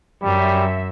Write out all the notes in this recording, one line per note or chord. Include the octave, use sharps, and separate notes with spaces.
F#2 G3 E5